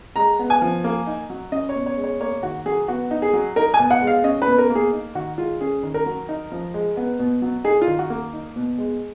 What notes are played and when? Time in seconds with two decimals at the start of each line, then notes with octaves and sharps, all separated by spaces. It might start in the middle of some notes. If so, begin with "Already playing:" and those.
0.16 G#3 A#5
0.39 B3
0.50 G#5
0.62 F3
0.84 A#3
1.07 D#4
1.30 F#3
1.52 C#4 D#5
1.69 C#5
1.75 B2
1.86 C#5
1.97 G#3
2.03 C#5
2.20 A#3 C#5
2.43 D#3 F#4
2.66 F#3 G#4
2.88 B3 F#4
3.11 D#4
3.22 G#4
3.33 F#3
3.56 D#4 A#4
3.74 G#5
3.79 B2
3.91 F#5
4.02 G#3
4.07 F5
4.24 C#4 D#5
4.42 B4
4.47 B2
4.58 A#4
4.70 A#3
4.75 G#4
4.93 D#4
5.15 D#3 F#4
5.38 G#3 F4
5.61 C#4 G#4
5.83 D#3
5.94 A#4
6.06 F#3
6.29 D#4
6.52 F3
6.74 G#3
6.97 B3
7.19 B2
7.42 F#3
7.64 D#4 G#4
7.82 F4
7.87 D#3
7.99 F#4
8.10 A#3
8.33 D#4
8.56 B2
8.78 G#3